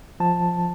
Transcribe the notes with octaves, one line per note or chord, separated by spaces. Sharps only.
F3 A5